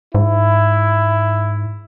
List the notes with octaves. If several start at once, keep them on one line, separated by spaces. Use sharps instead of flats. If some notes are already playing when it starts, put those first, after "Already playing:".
G#2 E4